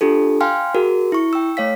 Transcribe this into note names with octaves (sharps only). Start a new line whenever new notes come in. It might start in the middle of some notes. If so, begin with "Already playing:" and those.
D4 F4 G4 A4
F5 G5 G#5 C6 F6
F#4 G#4 A#4
E4 C#6
G5 E6
A3 C#5 F5 B6